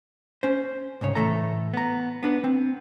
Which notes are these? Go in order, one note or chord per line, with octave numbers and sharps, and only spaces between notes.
C#4 C5
C2 G#2 C#3 C#5
A2 E3 G#3 A3 A4 A#5
B3 A#5
B3 D4 B4
C4